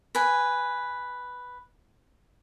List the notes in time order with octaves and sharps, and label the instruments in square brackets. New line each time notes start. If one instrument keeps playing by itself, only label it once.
[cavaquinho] B4 G#5